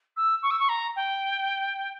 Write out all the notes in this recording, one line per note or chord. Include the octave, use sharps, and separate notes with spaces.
E6
C#6
E6
C#6
A#5
G5